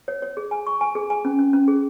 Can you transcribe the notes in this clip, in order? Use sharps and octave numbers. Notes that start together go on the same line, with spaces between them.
C#5
C#5
G#4
G#5
C#6
G#5
G#4
G#5
C#4
C#4
C#4
G#4